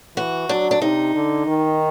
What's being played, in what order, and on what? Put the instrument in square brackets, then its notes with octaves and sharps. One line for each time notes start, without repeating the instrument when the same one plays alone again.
[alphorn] E3 [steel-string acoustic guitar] F#4
[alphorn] F#3 [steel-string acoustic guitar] D4
[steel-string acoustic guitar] D4
[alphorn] C3 [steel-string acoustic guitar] D#4
[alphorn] D3
D#3